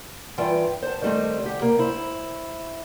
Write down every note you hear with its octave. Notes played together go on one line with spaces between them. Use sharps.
G2 E3 F4 G5
C5 A5
D#3 F3 G3 A3 C4
D2 G4
C3 A#3
E4 C5